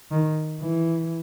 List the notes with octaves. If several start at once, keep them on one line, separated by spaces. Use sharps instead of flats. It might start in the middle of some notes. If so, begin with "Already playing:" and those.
D#3
E3